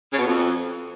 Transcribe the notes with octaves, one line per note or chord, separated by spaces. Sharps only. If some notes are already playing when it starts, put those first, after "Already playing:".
C#3
B2
F2